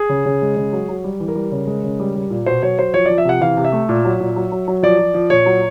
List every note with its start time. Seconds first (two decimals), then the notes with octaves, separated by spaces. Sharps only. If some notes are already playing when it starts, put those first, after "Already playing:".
Already playing: G#4
0.09 C#3
0.26 C#3
0.42 G#3
0.57 C#3
0.73 F#3
0.89 F#3
1.04 G3
1.20 E3
1.28 A#4
1.35 G3
1.52 C#3
1.67 G#3
1.84 C#3
2.00 G3
2.15 G3
2.30 A#2
2.46 B2 C5
2.63 F#3 C#5
2.78 F#3 C5
2.94 F3 C#5
3.06 F3 D5
3.18 E5
3.25 C3 F#5
3.41 E3 F5
3.57 C3
3.65 E5
3.72 A3
3.89 A#2
4.05 F#3
4.20 A#2
4.36 F#3
4.52 F#3
4.68 F#3
4.83 F3 D5
4.99 F3
5.14 F3
5.30 A#2 C#5
5.46 F#3